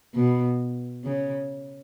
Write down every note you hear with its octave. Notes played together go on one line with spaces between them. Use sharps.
B2
C#3